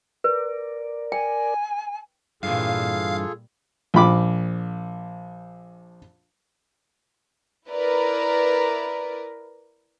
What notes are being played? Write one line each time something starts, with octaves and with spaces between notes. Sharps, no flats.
A#4 B4 D5
G5 G#5
G2 A#2 E3 G3 F4 G#4 A4 F5
A#1 F3 B5 D6
E4 A#4 B4 D5